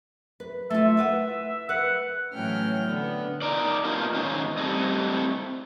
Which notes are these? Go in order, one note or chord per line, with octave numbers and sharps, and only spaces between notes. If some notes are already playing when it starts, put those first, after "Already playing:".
B4
A3 F4 E5
E4 B4 F#5
B4 F#5
A2 E3 F#3 C#4 G5 F6
D3 B3
D#4 A#4 D5
A3 B3 D#4 F4 A#4
G#2 D#3 C#4 D#4 C5
G3 A3 C4 D#5